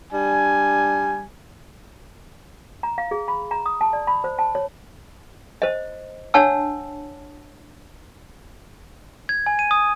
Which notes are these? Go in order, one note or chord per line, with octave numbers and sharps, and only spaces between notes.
G3 D4 G#5
A#5
F5
G#4
B5
A#5
D#6
A5
D5
B5
C5
A5
C#5
C5 D#5
D4 C#5 F#5 A5 E6
G#6
G#5
D#7
D#6